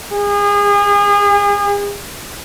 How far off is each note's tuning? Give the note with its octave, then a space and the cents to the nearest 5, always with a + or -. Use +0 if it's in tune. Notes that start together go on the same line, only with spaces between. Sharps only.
G#4 -35